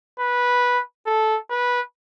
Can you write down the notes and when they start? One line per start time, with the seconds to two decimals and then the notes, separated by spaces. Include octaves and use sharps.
0.19 B4
1.06 A4
1.50 B4